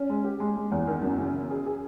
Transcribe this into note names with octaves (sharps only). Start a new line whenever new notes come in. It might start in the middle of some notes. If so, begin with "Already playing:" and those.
Already playing: C#4
G#3
G4
G#3
G#3
E2
D#3
F#2
C#3
C#3
G#4
G#4